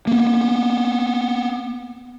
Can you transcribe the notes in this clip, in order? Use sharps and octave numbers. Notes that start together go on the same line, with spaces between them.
A#3 B3